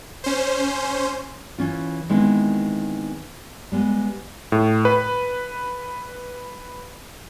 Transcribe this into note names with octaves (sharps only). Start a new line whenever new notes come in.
C#4 C5
E3 C#4 F4
D#3 G#3 B3 C4 E4
G3 G#3 B3
A2
B4